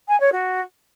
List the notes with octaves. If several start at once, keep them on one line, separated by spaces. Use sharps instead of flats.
G#5
C#5
F#4